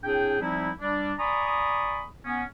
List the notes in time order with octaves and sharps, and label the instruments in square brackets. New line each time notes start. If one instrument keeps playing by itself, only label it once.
[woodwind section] A2 C4 D4 G#4 G5
F3 G3 C4 D#4 E4
G3 D4
D5 G#5 A#5 B5 C#6 D#6
B3 C#4